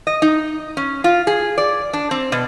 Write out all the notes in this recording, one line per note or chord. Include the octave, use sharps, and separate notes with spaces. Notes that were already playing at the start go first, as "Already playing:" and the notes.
D#5
D#4
C#4
F4
G#4
D5
D4
C4
B2